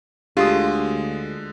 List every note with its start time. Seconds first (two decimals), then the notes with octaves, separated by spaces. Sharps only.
0.37 D2 D3 G#3 F4 G4 D#6